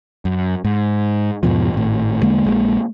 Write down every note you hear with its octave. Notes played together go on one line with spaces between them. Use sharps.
F#2
G#2
E2 G#2 B2 F3
G#1 A2
E2 D3 G#3 A#3
A#1 G#3 A#3